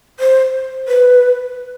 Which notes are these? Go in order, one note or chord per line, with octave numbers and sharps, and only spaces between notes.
C5
B4